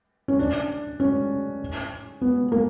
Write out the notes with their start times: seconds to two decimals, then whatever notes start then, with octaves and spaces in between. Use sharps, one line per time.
0.28 C#4
0.39 D4
1.00 C#4
2.21 B3
2.52 A#3